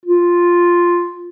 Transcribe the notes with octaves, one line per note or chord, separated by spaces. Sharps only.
F4